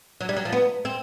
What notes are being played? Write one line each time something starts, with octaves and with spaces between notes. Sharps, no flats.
F#3
G3
F#3
F3
B3
C4